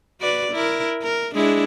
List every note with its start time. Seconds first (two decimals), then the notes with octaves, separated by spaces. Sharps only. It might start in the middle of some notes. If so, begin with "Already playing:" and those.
0.20 F#4 B4 D5
0.52 E4 A#4
1.02 A#4
1.35 G#3 D4 E4